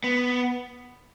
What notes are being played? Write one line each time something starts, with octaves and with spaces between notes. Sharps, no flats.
B3